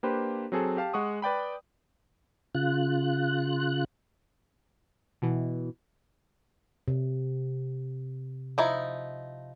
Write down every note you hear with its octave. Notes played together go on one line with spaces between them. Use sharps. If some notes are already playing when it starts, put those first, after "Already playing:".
A#3 D4 G4 B4 C5
F#3 C4 G#4 A4
G4 F5 A5
G#3 F#5 C#6 D#6
B4 D5 G5 B5
C#3 F4 F#6
B2 E3
C3
F3 D#4 E4